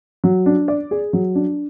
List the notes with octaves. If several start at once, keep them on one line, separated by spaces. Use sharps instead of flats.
F#3
D4
D5
G#4
F#3
D4